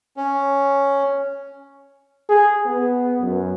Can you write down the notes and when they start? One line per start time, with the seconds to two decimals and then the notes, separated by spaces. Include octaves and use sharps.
0.17 C#4
2.29 G#4
2.66 B3
3.21 F#2